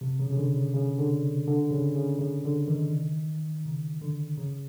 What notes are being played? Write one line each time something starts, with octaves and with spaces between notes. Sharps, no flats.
C3
C#3
C#3
D3
C#3
C#3
D3
D3
C#3
C#3
C#3
D3
D#3
C#3
D3
C#3